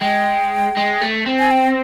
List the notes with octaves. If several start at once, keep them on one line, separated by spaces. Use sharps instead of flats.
G#3 G5
G#3
A3
C4
G#5
G5